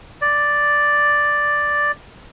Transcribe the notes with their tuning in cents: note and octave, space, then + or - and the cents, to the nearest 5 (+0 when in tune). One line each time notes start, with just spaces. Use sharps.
D5 +0